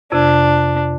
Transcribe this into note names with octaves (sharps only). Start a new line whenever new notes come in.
F2 C3 D4